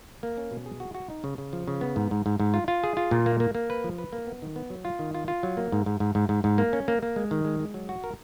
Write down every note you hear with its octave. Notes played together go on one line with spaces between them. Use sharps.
A#3
C#4
B2
G#4
F#4
F#4
D#4
C#3
C#3
F3
C#3
B3
G#2
G#2
G#2
G#2
F4
F4
G#4
F4
A#2
A#3
A#3
A#3
B4
F3
B4
A#3
B3
D#3
B3
F#3
F4
D#3
F4
F4
F#3
A#3
G#2
G#2
G#2
G#2
G#2
G#2
A#3
C#4
A#3
A#3
G#3
D#3
G#3
G#3
F#3
F#4
A#4